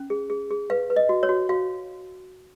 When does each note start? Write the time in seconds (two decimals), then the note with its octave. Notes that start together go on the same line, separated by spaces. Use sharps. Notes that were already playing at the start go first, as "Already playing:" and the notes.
Already playing: C#4
0.10 G#4
0.30 G#4
0.51 G#4
0.70 B4 F5
0.90 B4
0.96 D#5
1.09 F#4
1.23 C#5
1.29 F#4
1.49 F#4 F5